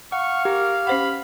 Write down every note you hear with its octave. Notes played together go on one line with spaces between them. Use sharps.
F5 F#5 C#6
G4 A#4
C#4 C5 F#5 B5